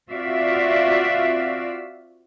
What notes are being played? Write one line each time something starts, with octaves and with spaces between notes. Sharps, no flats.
C4 F4 F#4 D5 E5 F5